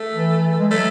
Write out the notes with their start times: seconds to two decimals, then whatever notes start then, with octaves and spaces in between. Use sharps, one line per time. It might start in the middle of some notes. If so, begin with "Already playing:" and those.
Already playing: A3
0.13 E3
0.60 G#3
0.71 F#3 A3